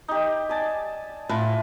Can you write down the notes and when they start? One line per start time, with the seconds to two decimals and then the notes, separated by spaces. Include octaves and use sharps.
0.08 D#4 G4
0.49 D5 G#5 A5
1.29 A2 F4 B4